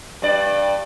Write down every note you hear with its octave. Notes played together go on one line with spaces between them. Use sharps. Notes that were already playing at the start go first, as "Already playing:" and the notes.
G2 D5